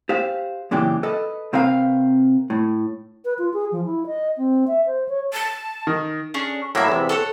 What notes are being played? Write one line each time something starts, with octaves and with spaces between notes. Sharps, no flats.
G4 C5 F5
F#2 A#2 C#3 E3 G4
A4 B4 D#5
C3 C4 A#4 B4 F5
A2
B4
F4
G#4
F3
E4
D#5
C4
E5
C5
C#5
A5
D#3
C#4 D4 G#4
A2 F#3 A#3 E5 B5
E2 C3
A4 C#5 F#5